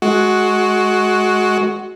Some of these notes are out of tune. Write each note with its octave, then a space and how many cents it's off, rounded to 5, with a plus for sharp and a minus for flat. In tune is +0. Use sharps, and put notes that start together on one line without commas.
G#3 +25 F#4 +0